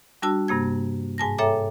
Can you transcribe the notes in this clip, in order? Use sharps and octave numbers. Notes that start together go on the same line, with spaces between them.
G3 D4 F#4 A5 E6
G2 C3 A#3 G#6
G#2 G#5 A5 A#6
A4 C#5 E5 G5 A#5 D6